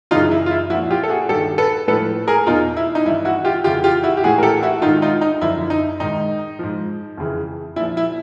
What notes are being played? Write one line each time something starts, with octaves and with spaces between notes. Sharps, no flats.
F#2 C#3 E3 D#4 F4
E4
F4
E4
A#2 F3 E4 F#4
F4 G4
A4
F#4 G#4
G2 D#3 G4 A4
A4 B4
A2 F3 A4 B4
G#4 A#4
E2 B2 D#4 F4
E4
D#4
G2 E3 E4
E4 F#4
F4 G4
F2 C#3 E3 F4 G4
F4 G4
E4 F#4
G4
A2 E3 F#4 G#4
A#4
G4 A4
E4 F#4
G#2 D#3 D#4 F4
D#4 F4
D#4
F#2 D3 F3 E4
D#4
G#2 D#3 D#4
G#2 F3
F2 C#3 E3
A#2 F3 E4
E4